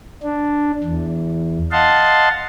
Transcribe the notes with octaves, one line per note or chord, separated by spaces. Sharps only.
D4
E2
D#5 F5 F#5 A5 C6